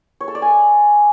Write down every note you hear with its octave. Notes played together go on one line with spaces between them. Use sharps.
C#5
A4
D5
G#5